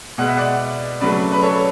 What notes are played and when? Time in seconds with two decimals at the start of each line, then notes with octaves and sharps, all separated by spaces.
0.18 B2 G#3 B3 F#5
0.28 E5
0.37 D5 F#5
1.01 C#3 F#3 A3 B4 D5
1.32 B4
1.42 A4 C#5